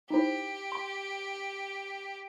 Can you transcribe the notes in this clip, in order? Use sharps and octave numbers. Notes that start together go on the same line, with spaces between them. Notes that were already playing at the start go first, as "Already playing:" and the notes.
D#4 E4 G4 C5
C6